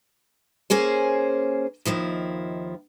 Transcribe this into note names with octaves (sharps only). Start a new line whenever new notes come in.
A#3 C#4 G#4 C5
D#2 D#3 F3 E4